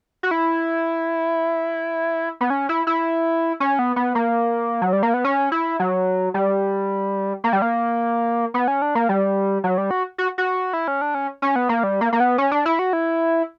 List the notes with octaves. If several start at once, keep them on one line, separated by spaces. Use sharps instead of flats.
F#4
E4
B3
C#4
E4
E4
C#4
B3
B3
A#3
F#3
G3
A#3
B3
C#4
E4
F#3
G3
A#3
G3
A#3
B3
C#4
D4
A#3
G3
F#3
G3
F#4
F#4
F#4
E4
C#4
D4
C#4
C#4
B3
A#3
G3
A#3
A#3
B3
C#4
D4
E4
F#4
E4